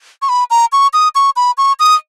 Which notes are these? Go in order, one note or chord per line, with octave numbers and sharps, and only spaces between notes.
C#6
B5
A#5
C#6
D#6
C#6
B5
C#6
D#6